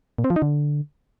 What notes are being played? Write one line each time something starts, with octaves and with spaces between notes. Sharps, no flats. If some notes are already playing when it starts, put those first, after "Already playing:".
A#2
C4
F3
D#4
D3